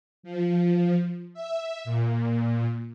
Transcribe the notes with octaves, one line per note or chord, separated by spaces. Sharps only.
F3
E5
A#2